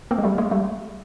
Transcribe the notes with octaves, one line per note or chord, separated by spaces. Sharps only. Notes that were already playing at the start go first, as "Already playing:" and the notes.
A#3 C4
G#3
G3 A3
G#3 A#3
G3 A3